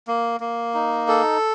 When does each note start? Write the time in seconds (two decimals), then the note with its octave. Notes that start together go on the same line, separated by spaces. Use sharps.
0.08 A#3
0.40 A#3
0.74 D#4
1.08 A4